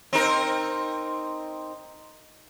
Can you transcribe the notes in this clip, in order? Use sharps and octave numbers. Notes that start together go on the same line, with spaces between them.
C4 D#4 A#4